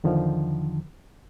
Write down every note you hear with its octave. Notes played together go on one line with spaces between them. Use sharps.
E2 D3 D#3 F3